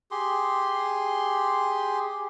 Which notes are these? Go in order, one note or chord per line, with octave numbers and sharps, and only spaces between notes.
G4 G#4 C6